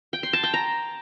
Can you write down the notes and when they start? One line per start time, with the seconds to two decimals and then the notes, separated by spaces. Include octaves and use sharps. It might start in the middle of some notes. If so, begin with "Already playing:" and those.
0.13 G5
0.23 C6
0.33 A5
0.43 G5
0.54 A#5